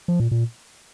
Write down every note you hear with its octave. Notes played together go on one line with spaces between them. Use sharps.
F3
A#2
A#2